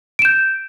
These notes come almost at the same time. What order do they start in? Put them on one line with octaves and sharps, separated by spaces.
D7 E7 G6